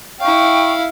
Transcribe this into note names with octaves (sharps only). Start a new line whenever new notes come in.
E4 F5 G5 C#6